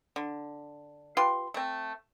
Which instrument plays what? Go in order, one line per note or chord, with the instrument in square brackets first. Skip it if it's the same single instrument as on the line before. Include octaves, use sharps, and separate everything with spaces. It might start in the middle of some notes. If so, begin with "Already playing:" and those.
[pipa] D3
F4 G4 B4 C6
A3 C4